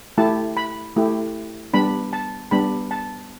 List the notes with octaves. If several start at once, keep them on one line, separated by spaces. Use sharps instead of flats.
A3 E4 G4 A5
B5
A3 E4 G4
G3 B3 D4 B5
A5
G3 B3 D4 B5
A5